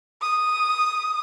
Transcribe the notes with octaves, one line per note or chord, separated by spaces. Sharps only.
D#6